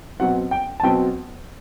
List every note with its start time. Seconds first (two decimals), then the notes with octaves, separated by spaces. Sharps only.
0.20 B2 F#3 C4 F#5
0.51 G5
0.80 A5
0.83 B2 F#3 C4 G5